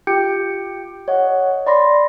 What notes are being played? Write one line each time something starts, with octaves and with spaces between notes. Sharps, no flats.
F4 G4 G5 G6 C#7 D7
C#5 D#5 F#5
D5 B5 C6 A#6